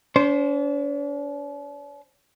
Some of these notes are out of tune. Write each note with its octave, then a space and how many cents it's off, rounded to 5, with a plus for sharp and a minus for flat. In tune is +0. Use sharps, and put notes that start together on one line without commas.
D4 -45 C5 +0